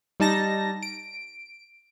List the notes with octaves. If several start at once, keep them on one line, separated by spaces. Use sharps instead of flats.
G3 D#4 A5 A#6
D7